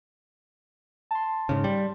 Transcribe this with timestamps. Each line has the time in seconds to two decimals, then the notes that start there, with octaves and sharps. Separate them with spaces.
1.11 A5 C6
1.49 G#2 C#3
1.64 G3